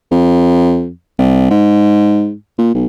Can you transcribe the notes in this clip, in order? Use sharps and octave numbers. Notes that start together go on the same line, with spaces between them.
F2
C2
G#2
A#2
B1